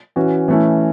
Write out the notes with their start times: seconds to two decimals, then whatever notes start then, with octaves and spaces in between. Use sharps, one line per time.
0.16 E3 C#4 F#4
0.48 E3 A3 C#4 E4